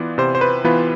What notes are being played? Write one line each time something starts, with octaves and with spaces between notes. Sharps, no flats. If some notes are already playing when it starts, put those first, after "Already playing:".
Already playing: E3 B3 F4 D5
C3 C5
C5
B4
E3 B3 F4 B4